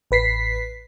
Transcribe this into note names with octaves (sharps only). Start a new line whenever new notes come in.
A1 B4 B6 C7